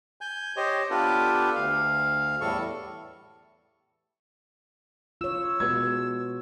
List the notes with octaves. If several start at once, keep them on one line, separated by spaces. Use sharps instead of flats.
G#5 G6
G4 C5 C#5 D#5
B3 D4 F4 G4 A4 B4
D2 F5
E2 A2 G3 A4 C#6
F4 C#5 E6
B2 G#3 G#6